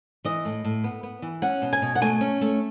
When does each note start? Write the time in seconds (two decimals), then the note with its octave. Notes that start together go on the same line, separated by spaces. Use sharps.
0.25 E3 D#5
0.45 A2
0.65 A2
0.84 B3
1.03 B3
1.22 E3
1.42 C#4 F#5
1.62 B2
1.73 G#5
1.82 B2
1.96 F#5
2.01 A3 G#5
2.21 C#4
2.41 A3